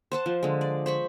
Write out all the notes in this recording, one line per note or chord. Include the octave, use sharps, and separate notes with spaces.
C5 F#5 A5
F3
D3 G#3
D5
C5 B5 C#6